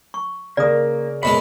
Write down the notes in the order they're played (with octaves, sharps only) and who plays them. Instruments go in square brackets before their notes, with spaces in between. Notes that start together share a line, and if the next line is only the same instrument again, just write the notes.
[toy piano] C#6
[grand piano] C#3 A#4 [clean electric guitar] A#3 [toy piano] D5 D#6
[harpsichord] F#2 B2 G#3 [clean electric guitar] B5